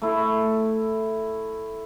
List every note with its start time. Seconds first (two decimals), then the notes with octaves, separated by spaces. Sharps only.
0.02 A3 E4